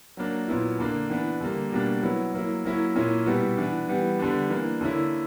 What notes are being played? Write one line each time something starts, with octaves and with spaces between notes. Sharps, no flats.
F#3 A#3 D4
A#2 F#3 B3 E4
D3 A#3 D4
E3 B3 D4
D3 G3 A#3
B2 G3 A#3 D4
F#3 B3 E4
F#3 A#3 E4
F#3 A#3 C#4 E4
A#2 A#3 C#4 E4
B2 G3 B3 E4
E3 B3 D4
E3 G3 B3
D3 G3 B3 D4
E3 A#3 D4
D3 A#3 C#4 E4